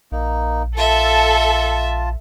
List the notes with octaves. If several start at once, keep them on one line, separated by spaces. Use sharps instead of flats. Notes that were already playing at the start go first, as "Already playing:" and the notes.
A#1 A#3 D#4
F4 A4 E5 A5